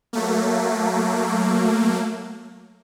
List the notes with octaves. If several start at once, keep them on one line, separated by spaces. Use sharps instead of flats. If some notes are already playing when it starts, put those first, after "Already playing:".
F#3 A3 A#3